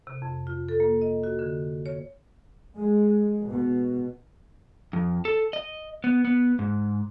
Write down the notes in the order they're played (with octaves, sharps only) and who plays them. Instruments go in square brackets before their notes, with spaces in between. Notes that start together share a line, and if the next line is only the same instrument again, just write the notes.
[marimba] C3
F2
F4
A4
A#3
D#5
F#4
D3
C#5
[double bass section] G#3
B2
[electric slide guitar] F2
A4
D#5
B3
B3
G#2